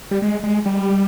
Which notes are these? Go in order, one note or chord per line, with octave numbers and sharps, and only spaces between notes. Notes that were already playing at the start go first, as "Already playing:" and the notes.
G3
G#3
G#3
G3